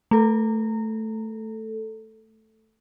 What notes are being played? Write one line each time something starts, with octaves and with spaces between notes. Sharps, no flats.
A3 A4